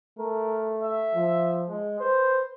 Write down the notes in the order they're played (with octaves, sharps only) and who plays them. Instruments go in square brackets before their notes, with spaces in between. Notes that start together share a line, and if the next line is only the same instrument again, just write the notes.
[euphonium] A3 [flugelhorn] A#4
[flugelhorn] E5
[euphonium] F3
[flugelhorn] G#3
[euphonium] B4 [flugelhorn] C5